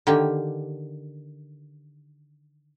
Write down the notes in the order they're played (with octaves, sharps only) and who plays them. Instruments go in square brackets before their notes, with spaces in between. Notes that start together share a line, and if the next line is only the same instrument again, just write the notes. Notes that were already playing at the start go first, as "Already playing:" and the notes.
[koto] D3 D#3 A#3 G4